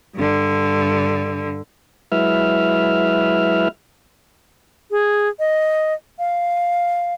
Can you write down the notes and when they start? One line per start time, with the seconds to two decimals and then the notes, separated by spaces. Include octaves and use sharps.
0.14 G2 D3
2.12 F#3 G#3 E4 B4 E5 F6
4.91 G#4
5.39 D#5
6.19 F5